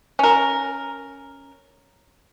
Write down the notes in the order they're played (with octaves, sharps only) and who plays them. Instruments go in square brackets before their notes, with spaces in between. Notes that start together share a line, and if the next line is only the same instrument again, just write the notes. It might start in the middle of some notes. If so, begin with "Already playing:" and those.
[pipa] C#4 A#4